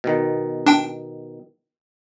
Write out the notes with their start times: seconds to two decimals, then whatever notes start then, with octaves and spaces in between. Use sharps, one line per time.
0.04 B2 D#3
0.66 D4 G5